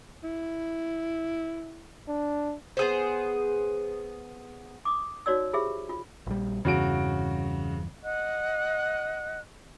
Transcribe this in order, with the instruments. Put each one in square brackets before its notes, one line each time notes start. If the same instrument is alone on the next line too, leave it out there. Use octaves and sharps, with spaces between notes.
[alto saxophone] E4
[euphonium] D4
[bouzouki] B3 G#4 C5
[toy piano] D6 D#6
D#4 F#4 C#5 D5 E6
F4 G4 G#4 C5 E5
F4
[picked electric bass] A#1 G3
[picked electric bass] E2 G2 E3 [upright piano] C#3 F#4 D7
[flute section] D#5 F#5 F#6